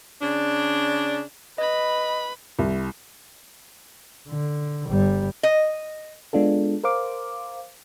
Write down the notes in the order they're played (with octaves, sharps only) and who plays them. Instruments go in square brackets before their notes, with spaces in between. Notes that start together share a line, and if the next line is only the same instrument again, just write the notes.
[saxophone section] C#3 D4
[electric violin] B4 B5 [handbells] D#5
[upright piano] C2
[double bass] D3
G1 G3
[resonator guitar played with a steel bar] D#5
[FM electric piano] G#3 B3 D4 F4 A4
A#4 C5 F5 D6